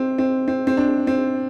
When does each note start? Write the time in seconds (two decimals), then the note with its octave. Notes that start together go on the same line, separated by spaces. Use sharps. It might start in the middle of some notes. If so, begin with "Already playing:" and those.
Already playing: C4
0.18 C4
0.48 C4
0.67 C4
0.77 D4
1.07 C4